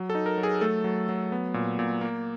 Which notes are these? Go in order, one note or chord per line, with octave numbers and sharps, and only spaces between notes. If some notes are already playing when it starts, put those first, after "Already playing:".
Already playing: F#3
A4
D#4
A#4
F#3
G#4
A3 A4
F#3
F#3
B3
A#2
A#2
A#3